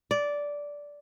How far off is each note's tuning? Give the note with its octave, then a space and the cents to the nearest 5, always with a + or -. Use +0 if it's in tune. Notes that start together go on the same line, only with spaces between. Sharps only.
D5 -10